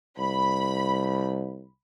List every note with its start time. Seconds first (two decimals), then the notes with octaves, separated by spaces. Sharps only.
0.18 C2 B5